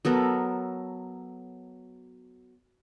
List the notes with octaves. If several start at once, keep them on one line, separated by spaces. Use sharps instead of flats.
F#3 B3 A4 A#4